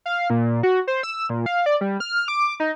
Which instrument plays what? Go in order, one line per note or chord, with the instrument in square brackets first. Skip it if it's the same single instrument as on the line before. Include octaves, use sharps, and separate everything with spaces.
[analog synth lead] F5
A#2
F#4
C5
E6
A#2
F5
D5
G3
F6
D6
D#4